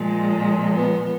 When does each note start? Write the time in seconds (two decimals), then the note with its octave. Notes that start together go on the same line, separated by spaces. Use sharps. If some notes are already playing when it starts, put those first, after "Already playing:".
Already playing: A#2 F3 G#3
0.74 B3